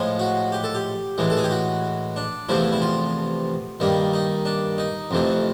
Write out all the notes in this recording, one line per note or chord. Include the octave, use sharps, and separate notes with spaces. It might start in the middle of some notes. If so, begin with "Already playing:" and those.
Already playing: A2 F3 G#3
F#4
G4
A4
G4
A2 E3 G#3
A4
G#4
G4
F#4
D4
E2 C3 F3 A3 E4
E4
F4
G2 D#3 G3 A#3
D#4
D4
D#4
F2 C3 E3 A3